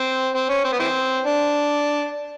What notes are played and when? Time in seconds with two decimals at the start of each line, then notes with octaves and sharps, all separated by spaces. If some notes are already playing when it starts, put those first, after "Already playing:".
Already playing: C4
0.34 C4
0.49 C#4
0.64 C4
0.73 B3
0.79 E3 C4
1.25 D4